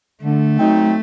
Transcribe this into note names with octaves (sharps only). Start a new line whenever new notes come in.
D3 A3
F#3 C4 D#4